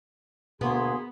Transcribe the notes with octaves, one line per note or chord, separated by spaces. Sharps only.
D2 B2 A#3 B3 F#4 G#4 C6